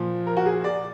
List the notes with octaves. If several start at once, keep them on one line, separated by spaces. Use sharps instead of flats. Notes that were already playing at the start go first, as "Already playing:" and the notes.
Already playing: A#2 F3
A#4
F#4
G#4
D5